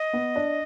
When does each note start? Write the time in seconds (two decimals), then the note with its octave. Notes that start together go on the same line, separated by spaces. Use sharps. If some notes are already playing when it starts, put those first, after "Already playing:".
Already playing: D#5
0.13 B3
0.36 D4